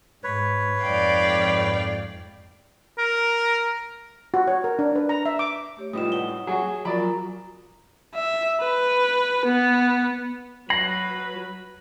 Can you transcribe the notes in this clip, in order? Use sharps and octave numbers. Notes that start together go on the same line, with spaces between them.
G#2 B4 C#5
F2 G#2 D5 F5 G5
A#4
F#4
C#5
A#4
D4
B4
A#5
E5
D6
A3 G4 C#5
A2 G3 D#4 F4 B4 G5 D#6 E7
C#5 F#5 A5 G7
F#3 F#4 G#4
F3 F#3 F4 A#4 D5 G#5 A#5 B5
E5
B4
B3
F#3 B4 B5 A#6 C7